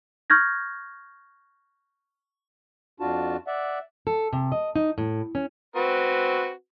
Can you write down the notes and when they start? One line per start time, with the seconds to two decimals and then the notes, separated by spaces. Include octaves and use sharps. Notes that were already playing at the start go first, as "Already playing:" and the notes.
0.30 C#6 F6 G6 G#6 A#6
3.00 F2 D4 F4 F#4 A5
3.47 D5 E5 F#5
4.07 A4
4.33 C3
4.52 D#5
4.75 D#4
4.98 A2
5.35 C#4
5.76 C4 F#4 B4